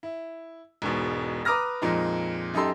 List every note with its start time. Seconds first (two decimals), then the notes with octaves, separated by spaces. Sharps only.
0.03 E4
0.82 E1 G#2 B2
1.45 B4 A#5 D6 D#6 F6 A#6
1.82 F2 A#2 G#3 D#4
2.54 F#2 D#4 G4 A4 C6